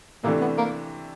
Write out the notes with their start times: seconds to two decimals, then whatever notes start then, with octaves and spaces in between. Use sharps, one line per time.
0.24 C3 E3 A3 A#3 D4
0.41 B3
0.58 A#3